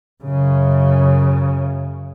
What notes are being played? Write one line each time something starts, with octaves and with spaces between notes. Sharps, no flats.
F#2 C#3